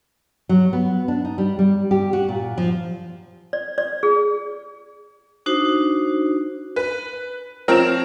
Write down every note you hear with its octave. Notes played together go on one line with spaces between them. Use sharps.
F#3
B3
D4
D#4
G3
G3
G4
F#4
A#2
F3
D5
D5
G#4
D4 D#4 F#4 C5
B4
F3 C4 A#4 C#5 E7